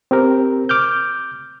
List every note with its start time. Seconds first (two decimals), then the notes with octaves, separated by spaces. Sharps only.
0.11 C4 G4 A#4
0.69 D6 F6 G6